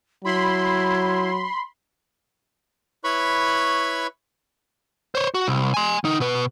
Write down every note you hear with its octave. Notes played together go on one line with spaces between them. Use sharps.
F#3 E4 B5 C6
E4 B4 C#5 B5 C#6
C5 C#5
F#4
C2
G#5 C6
D3 D#4
B2 B4